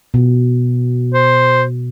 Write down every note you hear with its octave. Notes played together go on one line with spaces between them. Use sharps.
B2
C5